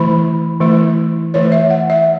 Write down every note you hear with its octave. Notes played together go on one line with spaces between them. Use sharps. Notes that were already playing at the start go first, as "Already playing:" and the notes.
Already playing: E3 A3 E4 B5
E3 A3 E4
E3 A3 E4 C#5
E5
F#5
E5